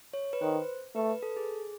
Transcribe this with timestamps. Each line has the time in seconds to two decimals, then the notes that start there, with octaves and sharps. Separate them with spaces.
0.14 C#5
0.33 B4
0.42 D#3 C5
0.95 A3 B4
1.10 B4
1.23 A4
1.37 G#4